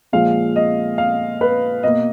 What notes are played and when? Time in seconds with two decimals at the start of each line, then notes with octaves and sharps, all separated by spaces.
0.13 A#2 F3 G#3 F5
0.56 D#5
0.98 F5
1.41 B4
1.83 B2 A#3 D#5